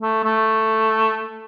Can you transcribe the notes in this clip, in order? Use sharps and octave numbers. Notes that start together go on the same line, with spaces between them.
A3
A3